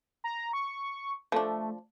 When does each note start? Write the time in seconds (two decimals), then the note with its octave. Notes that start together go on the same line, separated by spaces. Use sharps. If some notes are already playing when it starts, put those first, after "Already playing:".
0.24 A#5
0.53 C#6
1.32 F3 A3 D4